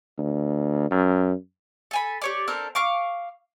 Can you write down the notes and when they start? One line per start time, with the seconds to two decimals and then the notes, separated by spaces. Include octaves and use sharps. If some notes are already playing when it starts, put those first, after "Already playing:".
0.19 D2
0.91 F#2
1.91 A4 G#5 B5
2.22 G4 C#5 D5
2.48 C4 D4 A4 A#4
2.75 F5 C#6 D6